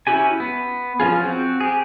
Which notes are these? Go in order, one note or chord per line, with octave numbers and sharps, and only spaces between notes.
C#4 E4 F#4 G4 G#5
B3
F3 C#4 F4 G#4
C4 F#4
G4 G#4